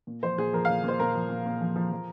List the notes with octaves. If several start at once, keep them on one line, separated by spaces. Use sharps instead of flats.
A#2
F3 C5
A#2 G#4
F3 A#4
A#2 F5
A#2 C5
A#2 A#4
F3
A#2
A#2
F3
F3
F3